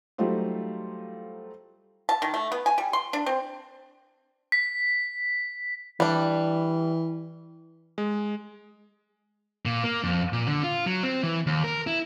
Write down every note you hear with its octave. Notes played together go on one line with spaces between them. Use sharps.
F#3 G3 A3 D#4 F4 C5
A5
D#3
A3
B3
G#5
G3
C6
D4
C4
B6
E3 G3 D4
G#3
A#2
A#3
F2
A#2
D3
F4
F#3
C4
E3
D#2
A#4
E4